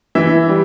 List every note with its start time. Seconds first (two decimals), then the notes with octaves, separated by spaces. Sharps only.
0.15 E3 E5
0.49 G3